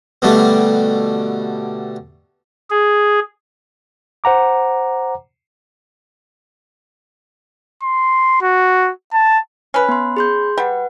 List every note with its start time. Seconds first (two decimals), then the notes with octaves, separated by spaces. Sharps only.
0.22 B2 D3 G3 A3
2.70 G#4
4.24 C5 F#5 A#5 D6
7.83 C6
8.42 F#4
9.13 A5
9.74 C#4 B4
9.89 B3 C6
10.17 G#4 C6 G6
10.58 G3 B4 F#5